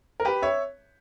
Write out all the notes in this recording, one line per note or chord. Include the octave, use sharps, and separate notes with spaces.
A#4
G4 B4
C#5 E5